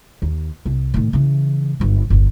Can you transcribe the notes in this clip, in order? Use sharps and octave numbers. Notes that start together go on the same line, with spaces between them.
D#2
C2
A2 D#3
C#3 E3
G1 F#2
G1 E2